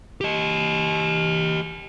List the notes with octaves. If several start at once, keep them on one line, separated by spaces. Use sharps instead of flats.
G4 D#5